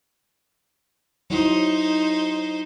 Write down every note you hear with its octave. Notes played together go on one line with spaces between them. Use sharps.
F#3 D#4 E4 C5